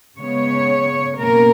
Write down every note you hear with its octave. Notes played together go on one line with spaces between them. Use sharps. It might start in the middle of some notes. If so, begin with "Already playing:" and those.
C#3 G#3 B3 C#5
B2 A#3 C#4 A#4